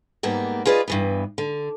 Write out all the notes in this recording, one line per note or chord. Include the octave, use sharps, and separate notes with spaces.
G#2 G3 A#3 B3
F4 G#4 B4 D5 D#5
G2 E3 B3
D3